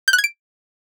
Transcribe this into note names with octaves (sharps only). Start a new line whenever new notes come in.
G6
F#6
G#6
D7